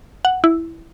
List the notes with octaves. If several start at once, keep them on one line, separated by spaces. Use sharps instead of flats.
F#5
E4